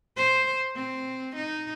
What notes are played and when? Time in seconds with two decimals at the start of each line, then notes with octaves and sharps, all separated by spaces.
0.17 C5
0.76 C4
1.36 D#4